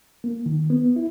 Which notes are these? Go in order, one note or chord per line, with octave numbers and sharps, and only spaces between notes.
A#3
D#3
B3
E4